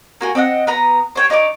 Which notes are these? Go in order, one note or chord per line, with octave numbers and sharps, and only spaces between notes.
A#3 F#4 G#5
C4 D#5 E5 F#5
B3 A#5 D#6
C5 C#5 G5
D#4 C#5 D5 D6